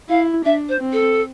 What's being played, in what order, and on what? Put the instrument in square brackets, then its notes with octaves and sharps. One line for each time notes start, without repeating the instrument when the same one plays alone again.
[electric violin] E4 [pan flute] F5
[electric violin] D4 [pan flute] E5
[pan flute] C5
[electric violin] C4
[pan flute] A4